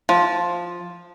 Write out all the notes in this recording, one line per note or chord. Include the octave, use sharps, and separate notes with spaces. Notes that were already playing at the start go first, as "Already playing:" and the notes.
F3